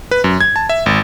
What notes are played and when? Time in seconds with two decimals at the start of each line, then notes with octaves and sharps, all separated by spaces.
0.11 B4
0.24 F#2
0.41 G#6
0.56 A5
0.69 E5
0.86 G#1